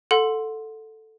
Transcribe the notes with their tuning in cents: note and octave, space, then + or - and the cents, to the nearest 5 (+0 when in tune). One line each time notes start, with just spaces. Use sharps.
A4 +0 F#5 -25 C6 +0